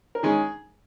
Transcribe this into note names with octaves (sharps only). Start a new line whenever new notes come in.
A#4
D#3 G#3 C#4 G#4